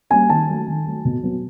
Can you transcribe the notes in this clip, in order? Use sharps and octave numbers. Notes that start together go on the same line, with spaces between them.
G3 A#3 C#4 G#5
D#3 A5
F#3 A3
D#3
F#3 A3
B2
F#3 B3